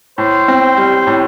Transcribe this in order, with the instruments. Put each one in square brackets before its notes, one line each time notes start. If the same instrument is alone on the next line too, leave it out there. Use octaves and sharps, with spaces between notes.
[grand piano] A2 [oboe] C5
[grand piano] C4
G3
A2